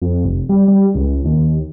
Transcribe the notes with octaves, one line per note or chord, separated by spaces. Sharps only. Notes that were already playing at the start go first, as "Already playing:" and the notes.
F2
F1
G3
G3
C#2
D#2